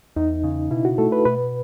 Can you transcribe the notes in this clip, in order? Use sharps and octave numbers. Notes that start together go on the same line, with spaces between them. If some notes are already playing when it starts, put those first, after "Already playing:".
E2 D#4
C#3
B2 E4
F#4
A3 A4
B4
B2 B4